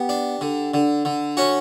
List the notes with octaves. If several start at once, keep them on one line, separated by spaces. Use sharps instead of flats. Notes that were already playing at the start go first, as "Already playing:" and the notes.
Already playing: B3 G4
D4
D3
D3
D3
C#4 F#4